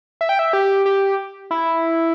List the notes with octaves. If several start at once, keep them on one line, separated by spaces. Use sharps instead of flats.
E5
G5
E5
G4
G4
E4